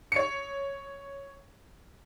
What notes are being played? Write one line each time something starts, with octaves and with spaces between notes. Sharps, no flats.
C#5 C#7